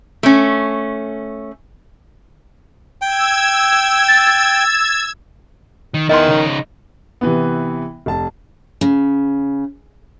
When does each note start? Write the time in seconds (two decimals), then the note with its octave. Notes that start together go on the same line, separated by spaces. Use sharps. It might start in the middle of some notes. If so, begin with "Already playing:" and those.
0.23 A3 C#4
3.02 G5 E6 G#6
4.08 A6
5.94 D#3
6.09 D#3 B3 E4 D#5 C6
6.28 C#3 D#4
7.21 C3 E3 B3
8.06 F1 A5
8.81 C#3